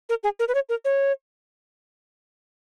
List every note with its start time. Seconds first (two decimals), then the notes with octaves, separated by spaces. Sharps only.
0.09 A#4
0.23 G#4
0.39 A#4
0.48 B4
0.55 C#5
0.69 A#4
0.85 C#5